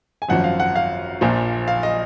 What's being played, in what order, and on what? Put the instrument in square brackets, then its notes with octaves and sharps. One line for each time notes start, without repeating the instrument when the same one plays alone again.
[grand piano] G#5
G#1 F#2 F3 F#5
F5
F#5
F5
A#1 A#2 F3
F5
D#5